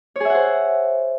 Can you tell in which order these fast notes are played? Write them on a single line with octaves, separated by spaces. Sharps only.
C#5 G#4 E5 F#5 C5